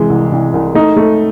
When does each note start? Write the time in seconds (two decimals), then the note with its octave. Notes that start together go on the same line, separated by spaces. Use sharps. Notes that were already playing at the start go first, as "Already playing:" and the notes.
Already playing: C3 E3 G#3
0.10 C2
0.32 C2
0.54 C2
0.75 A3 D#4
0.96 A3